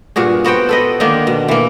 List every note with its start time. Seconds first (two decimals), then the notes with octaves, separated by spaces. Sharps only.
0.16 G2 A#2 F#4 G#4
0.45 B3 F#4 C5 G5
0.69 A4 B4 D#5
1.00 D3 D#3 A#3 D4
1.27 B2
1.48 E3 A#3